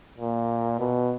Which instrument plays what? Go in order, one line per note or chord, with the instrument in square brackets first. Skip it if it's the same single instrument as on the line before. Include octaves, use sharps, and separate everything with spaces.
[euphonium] A#2
B2